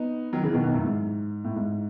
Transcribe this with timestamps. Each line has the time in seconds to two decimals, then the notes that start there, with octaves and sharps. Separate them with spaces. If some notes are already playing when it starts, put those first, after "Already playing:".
Already playing: B3 D#4
0.33 D#3 F#3
0.43 C#3 E3
0.53 B2 D#3
0.64 B2 D#3
0.74 F#2 A2
0.84 G#2
1.44 A2
1.56 G#2